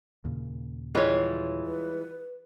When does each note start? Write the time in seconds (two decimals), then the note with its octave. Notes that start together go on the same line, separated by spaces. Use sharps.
0.24 D#2 A#2 C#3
0.95 E3 G3 G#3 F4 C#5
1.65 B4